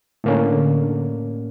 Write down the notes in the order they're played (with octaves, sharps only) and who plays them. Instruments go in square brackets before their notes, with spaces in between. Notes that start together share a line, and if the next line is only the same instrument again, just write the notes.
[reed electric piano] A2 A#3 C#4 [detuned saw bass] D3